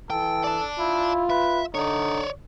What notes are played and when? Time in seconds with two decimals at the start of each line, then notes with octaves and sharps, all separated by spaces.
0.10 E3 A4 G5
0.44 D5 A5
0.79 E4 F4
1.30 B4 E5
1.74 D3 D#4 C#5 D5